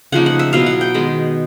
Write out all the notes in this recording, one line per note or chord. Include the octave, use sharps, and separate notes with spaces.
C#3 F3 A#3 D#4 F#5
F#5
E5
B2 F#3 B3 E4 F5
F#5
G5
D#3 G#3 B3